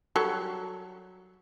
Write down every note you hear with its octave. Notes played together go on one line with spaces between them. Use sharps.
F#3 G3 A4